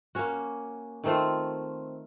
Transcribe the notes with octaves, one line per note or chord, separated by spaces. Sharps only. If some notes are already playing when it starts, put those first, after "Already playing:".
A#3 C#4 F#4
D#3 A3 C4 F4